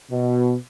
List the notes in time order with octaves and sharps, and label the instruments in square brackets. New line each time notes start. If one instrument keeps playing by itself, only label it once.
[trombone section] B2